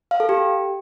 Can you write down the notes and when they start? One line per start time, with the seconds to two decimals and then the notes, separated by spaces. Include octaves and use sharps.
0.11 F5
0.20 A4
0.29 G4